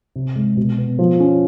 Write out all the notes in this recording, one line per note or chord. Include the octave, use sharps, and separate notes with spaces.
C3
G#3
B2
B3
F3
C#4